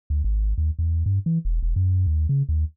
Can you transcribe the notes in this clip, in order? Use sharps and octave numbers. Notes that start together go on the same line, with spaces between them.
D2
G#1
D#2
E2
G2
E3
E1
E1
F#2
D#2
C#3
D#2